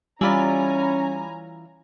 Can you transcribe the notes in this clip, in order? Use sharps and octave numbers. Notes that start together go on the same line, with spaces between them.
E3 G3 C#4 F4 D5 G#5 A#5 B5